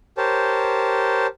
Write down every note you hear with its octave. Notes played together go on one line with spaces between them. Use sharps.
G4 A#4 C5 C#5 A5